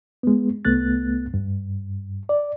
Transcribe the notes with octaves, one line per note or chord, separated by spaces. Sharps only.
G#3 B3
C2 A3 B3 F#6 A6
G2
D5